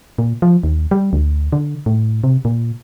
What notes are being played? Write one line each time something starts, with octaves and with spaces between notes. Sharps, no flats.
A#2
F3
D#2
G3
D2
D3
A2
C3
A#2